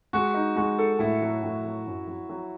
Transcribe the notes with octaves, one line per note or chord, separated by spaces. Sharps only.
G#3 F#4
D#4
G#3 F#4
A4
A2 E4
F#3
A2
F#3
F#2
F#3
F#3